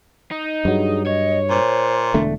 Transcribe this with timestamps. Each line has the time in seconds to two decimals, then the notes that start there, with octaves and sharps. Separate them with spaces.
0.31 D#4
0.65 G2 F#3 G#4
1.06 C#5 D#5
1.50 A#2 C5
2.14 E1 D3 A3